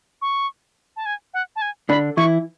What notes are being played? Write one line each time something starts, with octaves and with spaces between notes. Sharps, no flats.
C#6
A5
G#5
F#5
A5
G#5
D3 D4 B5
E3 E4 C#6